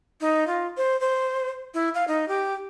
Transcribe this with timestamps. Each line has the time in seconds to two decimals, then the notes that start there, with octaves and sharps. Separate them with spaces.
0.21 D#4
0.47 F4
0.77 C5
1.01 C5
1.74 E4
1.95 F5
2.08 D#4
2.28 G4